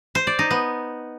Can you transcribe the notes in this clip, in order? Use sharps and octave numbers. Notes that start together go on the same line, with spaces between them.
C5
D5
D#4
B3